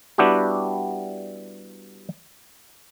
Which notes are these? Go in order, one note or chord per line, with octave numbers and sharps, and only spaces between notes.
G3 B3 D4 E4 F#4 G4